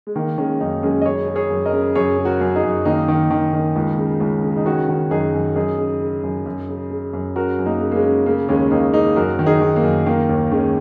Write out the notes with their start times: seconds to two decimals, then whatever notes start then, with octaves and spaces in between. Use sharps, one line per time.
0.07 G#3
0.15 D#3 A#3
0.38 D#3 G#3 C#4
0.60 F#2 A#3 D#4
0.83 F#2 G#3 C#4
1.02 D#5
1.05 C#3 G#4 C#5
1.28 C#3
1.36 G#4 C#5
1.50 F#2
1.66 A#4 D#5
1.73 C#3
1.95 F#2 G#4 C#5
2.18 C#3
2.25 F#4 A#4
2.41 F#2
2.56 D#4 G#4
2.63 F#2
2.85 D#3 A#3 D#4
3.08 D#3
3.30 D#3
3.53 D#3
3.76 C#2
3.98 C#3
4.21 C#2
4.43 C#3
4.57 D#4
4.65 D#3 C#4 F#4
4.89 D#3
5.11 F#2 D#4 G#4
5.34 F#2
5.55 F#2 D#4 G#4
5.78 C#3
6.01 C#3
6.23 F#2
6.46 F#2
6.69 C#3
6.91 C#3
7.13 F#2
7.36 C#3 F#4 A#4
7.59 F#2
7.66 A#3 D#4
7.81 C#3
7.92 A#3
7.96 G#3 C#4
8.04 C#3
8.26 C#3 A#3
8.48 D#2 G#3 C#4
8.71 D#2 A#3 D#4
8.93 C#3 A#3 D#4
9.16 F#2 F#4 A#4
9.39 D#3
9.46 D#4 G#4
9.62 D#3
9.76 A#3
9.84 F#2
10.06 D#3 A#3
10.29 D#2
10.51 D#3 G#3 C#4